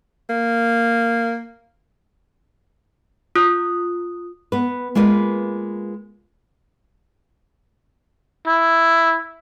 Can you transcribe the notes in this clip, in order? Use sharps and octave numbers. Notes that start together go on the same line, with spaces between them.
A#3
F4 D#6 F#6
B3 B4
G#3 A#3 F4 B4
E4